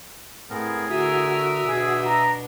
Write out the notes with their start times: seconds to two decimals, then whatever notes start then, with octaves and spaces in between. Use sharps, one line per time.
0.50 A2 B3 C4 G#4 A#4
0.90 D3 F#4 A#4 E5 D#6 E6
1.68 B2 D4 G#4
2.05 A#5